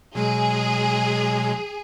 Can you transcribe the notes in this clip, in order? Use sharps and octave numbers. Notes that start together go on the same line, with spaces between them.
B2 F#3 G#3 G#4